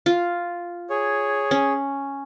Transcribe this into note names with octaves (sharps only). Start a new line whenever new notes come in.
F4
G#4 C#5
C#4